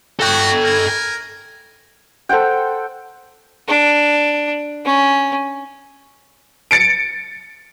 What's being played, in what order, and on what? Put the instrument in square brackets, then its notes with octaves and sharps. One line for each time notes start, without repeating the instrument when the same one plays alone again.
[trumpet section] F#4 [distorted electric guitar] A4 G5
[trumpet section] A#4 G#5
[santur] A4 C5 F#5 G5
[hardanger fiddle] D4
C#4
[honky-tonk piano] A6 C#7 D7